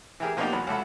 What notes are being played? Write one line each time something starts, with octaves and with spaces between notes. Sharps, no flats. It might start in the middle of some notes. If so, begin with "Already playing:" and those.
E3 E4 G4 G#4 A#4
F3 A#3 B3 D4 D#4 G4
E2 F#3 B5
C#2 F#4 A4 E5 B5